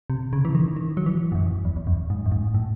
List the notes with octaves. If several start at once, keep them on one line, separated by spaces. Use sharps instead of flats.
C3
C#3
E3
D#3
D#3
F#3
E3
G#2
F#2
E2
E2
F#2
G#2
F#2
G#2
A2